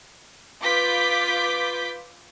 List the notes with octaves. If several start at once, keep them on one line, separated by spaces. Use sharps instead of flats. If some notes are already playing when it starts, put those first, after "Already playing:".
F4 B4 D6 G6 B6